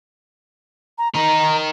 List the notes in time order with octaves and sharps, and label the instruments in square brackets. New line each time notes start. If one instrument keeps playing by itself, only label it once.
[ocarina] A#5
[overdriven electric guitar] D#4 A#4 [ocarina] A#5